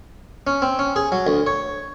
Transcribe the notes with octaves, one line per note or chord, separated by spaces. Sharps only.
C#4
C4
C#4
G#4
F#3
D2
C#5